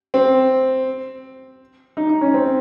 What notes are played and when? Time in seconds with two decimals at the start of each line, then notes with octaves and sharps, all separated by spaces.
0.14 C4
1.97 D#4
2.09 D#4
2.21 C#4
2.34 C4